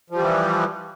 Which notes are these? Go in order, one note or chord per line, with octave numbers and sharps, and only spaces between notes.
E3 F3 G3